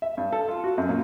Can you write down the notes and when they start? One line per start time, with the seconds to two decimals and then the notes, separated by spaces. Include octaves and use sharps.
0.02 E5
0.17 G2
0.33 A4
0.48 F4
0.64 F#4
0.78 F#2
0.89 A#2